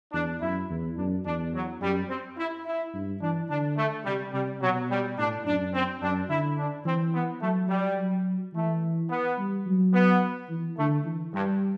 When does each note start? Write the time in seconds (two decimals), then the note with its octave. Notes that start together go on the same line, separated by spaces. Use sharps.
0.13 E2 D4
0.41 F#2 E4
0.70 E2
0.97 F#2 D4
1.26 E2 D4
1.54 F#3
1.81 F#2 G3
2.09 C4
2.37 E4
2.66 E4
2.94 G2
3.22 E3 D4
3.50 D3 D4
3.77 A3
4.05 C3 G3
4.33 C3 G3
4.61 B2 F#3
4.90 G3
5.18 A2 D4
5.45 F#2 D4
5.74 C4
6.02 F#2 D4
6.29 D3 E4
6.58 D4
6.85 E3 C4
7.14 B3
7.41 F#3 A3
7.69 G3
7.98 F#3
8.54 E3 A3
9.09 B3
9.38 G3
9.67 F#3
9.93 B3
10.49 E3
10.78 D3 A3
11.06 E3
11.34 G2 G3